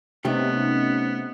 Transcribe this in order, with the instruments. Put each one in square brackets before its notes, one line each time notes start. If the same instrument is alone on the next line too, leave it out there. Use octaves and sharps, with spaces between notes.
[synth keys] C3 [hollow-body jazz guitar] A3 G4 [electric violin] B3 [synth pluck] C#4 D#4